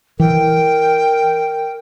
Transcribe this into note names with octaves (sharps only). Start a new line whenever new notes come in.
E3 A#4 G5